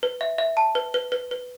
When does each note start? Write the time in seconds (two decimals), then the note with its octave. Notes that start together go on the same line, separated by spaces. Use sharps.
0.03 B4
0.21 E5
0.38 E5
0.57 A5
0.75 B4
0.94 B4
1.12 B4
1.31 B4